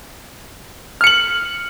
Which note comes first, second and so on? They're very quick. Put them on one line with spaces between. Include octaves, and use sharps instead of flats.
F6 C#7 F#7